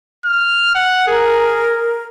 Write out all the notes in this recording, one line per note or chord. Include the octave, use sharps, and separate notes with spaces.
F6
F#5
G#4 A#4